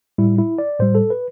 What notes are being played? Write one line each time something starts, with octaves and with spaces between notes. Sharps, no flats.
A2 G3 E4
E4
D5
A2 G3 C5
A4
B4